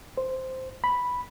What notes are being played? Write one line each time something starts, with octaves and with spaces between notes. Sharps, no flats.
C5
B5